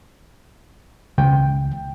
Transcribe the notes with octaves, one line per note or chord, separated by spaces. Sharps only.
C#2 G5